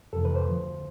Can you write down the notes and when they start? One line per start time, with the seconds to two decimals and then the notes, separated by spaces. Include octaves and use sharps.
0.13 F2 C3 E3 A4
0.25 B4
0.35 C5
0.46 D2 D3 F3